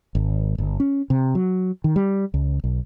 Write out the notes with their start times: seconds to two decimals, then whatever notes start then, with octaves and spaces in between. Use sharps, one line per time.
0.15 G#1
0.58 G1
0.80 C#4
1.10 C3
1.35 F#3
1.84 D#3
1.96 G3
2.34 C#2
2.64 B1